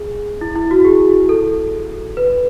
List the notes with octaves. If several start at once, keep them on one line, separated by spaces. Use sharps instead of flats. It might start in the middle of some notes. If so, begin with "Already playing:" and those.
Already playing: G#4
E4
E4
F#4
G#4
A4
B4